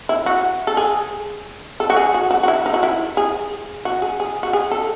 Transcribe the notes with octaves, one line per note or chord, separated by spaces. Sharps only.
E4
F#4
A4
G#4
A4
F#4
G#4
F#4
F#4
F#4
E4
D#4
F#4
E4
G#4
F#4
G#4
G#4
F#4
G#4
A4